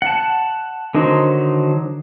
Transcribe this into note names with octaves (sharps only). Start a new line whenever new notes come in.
F#5 A5
D3 D#3 F#3 D#4 C5